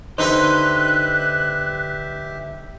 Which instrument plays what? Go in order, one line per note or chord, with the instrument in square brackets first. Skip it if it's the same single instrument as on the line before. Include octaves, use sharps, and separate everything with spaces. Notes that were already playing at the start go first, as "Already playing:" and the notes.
[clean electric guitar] D3 C5 [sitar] D#4 B4 [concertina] G4 E5 [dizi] F#6